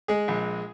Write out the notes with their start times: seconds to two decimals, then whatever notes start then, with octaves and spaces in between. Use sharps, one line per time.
0.08 G#3 G#4
0.28 A#1